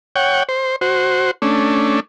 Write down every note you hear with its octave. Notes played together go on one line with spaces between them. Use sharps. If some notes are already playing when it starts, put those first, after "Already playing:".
C#5 F#5 G5
C5
F#4 C5
A3 C#4 D4